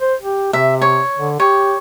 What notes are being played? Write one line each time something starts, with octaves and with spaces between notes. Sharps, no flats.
C5
G4
C3 E5
C#5
D3
G4 C#5